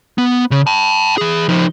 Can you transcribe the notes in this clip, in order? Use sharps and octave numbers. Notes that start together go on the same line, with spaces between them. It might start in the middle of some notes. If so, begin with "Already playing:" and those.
B3
C#3
G5 A5
E3 G#4
F3 D#4